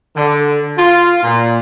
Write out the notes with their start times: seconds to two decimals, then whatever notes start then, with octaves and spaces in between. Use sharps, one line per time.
0.15 D3
0.78 F4
1.23 A#2